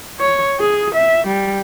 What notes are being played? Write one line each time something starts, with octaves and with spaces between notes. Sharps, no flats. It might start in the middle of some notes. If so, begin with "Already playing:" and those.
C#5
G#4
E5
G3